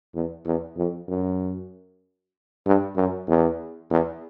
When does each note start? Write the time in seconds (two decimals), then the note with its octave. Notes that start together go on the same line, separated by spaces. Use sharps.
0.15 E2
0.46 E2
0.77 F2
1.08 F#2
2.66 G2
2.96 F#2
3.28 E2
3.90 E2